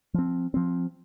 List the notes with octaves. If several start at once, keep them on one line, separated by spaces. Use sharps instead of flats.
F3 C4
F3 C4